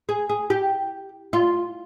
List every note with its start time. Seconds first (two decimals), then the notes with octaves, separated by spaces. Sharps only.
0.09 G#4
0.29 G#4
0.50 G4
1.33 F4